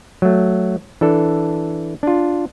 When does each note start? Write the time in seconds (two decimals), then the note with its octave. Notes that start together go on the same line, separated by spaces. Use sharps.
0.22 F#3 A3
1.01 E3 D4 A4
2.03 D4 F4